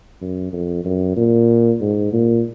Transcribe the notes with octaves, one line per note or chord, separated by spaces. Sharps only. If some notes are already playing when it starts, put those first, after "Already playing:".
F#2
F2
F#2
A#2
G#2
A#2